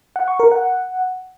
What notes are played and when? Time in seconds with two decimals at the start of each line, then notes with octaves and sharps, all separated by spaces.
0.16 F#5
0.28 C#6
0.40 A#4
0.52 F#5